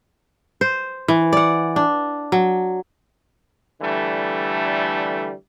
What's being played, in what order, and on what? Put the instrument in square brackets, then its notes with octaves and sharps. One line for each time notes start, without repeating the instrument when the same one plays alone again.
[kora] C5
E3
D5 F#5
D4
F#3
[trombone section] D3 E3 G3 A3